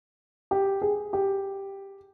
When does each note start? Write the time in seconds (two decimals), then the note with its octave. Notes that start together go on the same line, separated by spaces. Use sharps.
0.51 G4
0.82 G#4
1.13 G4